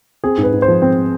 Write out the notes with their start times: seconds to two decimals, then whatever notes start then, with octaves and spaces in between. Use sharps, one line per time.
0.24 C4 G#4
0.38 G#2
0.43 B4
0.53 G#2
0.62 C5
0.68 F3
0.82 C4